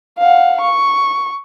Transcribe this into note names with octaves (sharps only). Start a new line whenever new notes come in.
F5 F#5
C#6